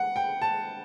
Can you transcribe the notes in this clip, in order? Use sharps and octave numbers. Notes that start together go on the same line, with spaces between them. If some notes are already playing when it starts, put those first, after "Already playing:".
Already playing: F#5
G5
A5